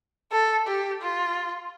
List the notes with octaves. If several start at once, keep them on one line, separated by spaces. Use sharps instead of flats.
A4
G4
F4